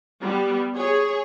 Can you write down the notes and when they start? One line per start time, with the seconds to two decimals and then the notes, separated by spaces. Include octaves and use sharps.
0.21 G3 B3
0.74 G#4 C#5